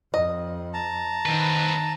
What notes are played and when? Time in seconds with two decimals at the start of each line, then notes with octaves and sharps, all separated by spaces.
0.14 F2 D#5
0.74 A5 A#5
1.26 D#3 C4 B4